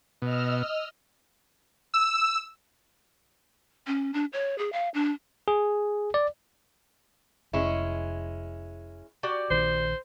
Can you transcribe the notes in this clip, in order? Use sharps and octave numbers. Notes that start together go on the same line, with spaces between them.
B2 D#5 E6 F6
E6
C#4
D4
C#5
G#4
F5
D4
G#4
D5
F1 G#3 C#4 E4
F#4 G4 D5
A#1 D#3 C5